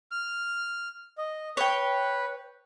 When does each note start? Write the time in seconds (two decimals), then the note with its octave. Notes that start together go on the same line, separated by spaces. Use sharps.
0.11 F6
1.18 D#5
1.57 B4 C#5 G5